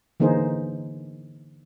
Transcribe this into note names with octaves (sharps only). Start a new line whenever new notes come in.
D3 E3 A#3 D#4 G#4 C5